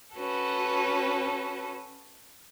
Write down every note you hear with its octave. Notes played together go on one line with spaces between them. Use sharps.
C#4 F#4 A4 B4